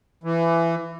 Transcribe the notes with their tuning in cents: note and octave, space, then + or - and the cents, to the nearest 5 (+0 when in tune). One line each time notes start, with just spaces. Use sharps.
E3 +20